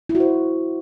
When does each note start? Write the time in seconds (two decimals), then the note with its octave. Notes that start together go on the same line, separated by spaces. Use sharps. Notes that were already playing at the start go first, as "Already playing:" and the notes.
0.09 E4
0.15 F#4
0.20 C5